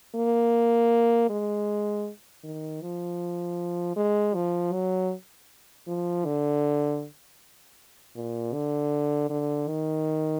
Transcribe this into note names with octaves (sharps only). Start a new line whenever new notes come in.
A#3
G#3
D#3
F3
G#3
F3
F#3
F3
D3
A#2
D3
D3
D#3